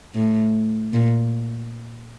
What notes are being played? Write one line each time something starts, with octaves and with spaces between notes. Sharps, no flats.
A2
A#2